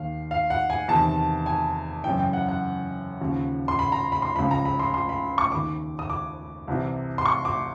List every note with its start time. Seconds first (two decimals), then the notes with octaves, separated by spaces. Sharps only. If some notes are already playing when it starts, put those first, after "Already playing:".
Already playing: D#2 D#3 F5
0.31 F5
0.50 F#5
0.70 G#5
0.88 E2 C3 D#3 A5
1.46 G#5
2.04 F#2 C#3 E3 G5
2.19 G5
2.33 F#5
2.49 F#5
3.21 D#2 C#3 F3
3.68 C6
3.79 B5
3.92 A#5
4.12 B5
4.22 C6
4.36 C#2 C#3 F3 B5
4.51 A#5
4.65 B5
4.79 C6
4.94 C6
5.09 B5
5.38 C#6
5.52 D#2 D#3 D6
5.99 D#6
6.10 D6
6.67 C2 C3 E3
7.18 C6
7.26 C#6
7.45 D6